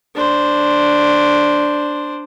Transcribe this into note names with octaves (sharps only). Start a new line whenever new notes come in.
D4 C5